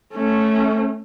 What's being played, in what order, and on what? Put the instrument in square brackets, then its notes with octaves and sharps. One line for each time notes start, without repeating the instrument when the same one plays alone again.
[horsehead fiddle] A3 C#4